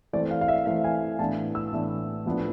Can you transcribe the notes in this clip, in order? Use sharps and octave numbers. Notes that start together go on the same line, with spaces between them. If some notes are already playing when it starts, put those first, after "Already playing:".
E3 A3 C4 D5
F5
F5
E5
E3 A3 C4 E5
G#5
A2 E3 B3 D4 A5
E6
A2 E3 B3 D4
A2 F3 B3 D4